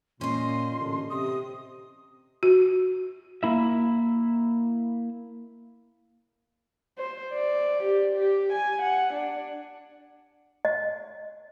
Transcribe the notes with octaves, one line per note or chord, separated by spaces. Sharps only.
A#2 C#4 D#5 C6
A1 D3
C3 D#6
F#4
A#3 E4 E5
C5
D5
G4
G4
G#5
F#5
D4
D#5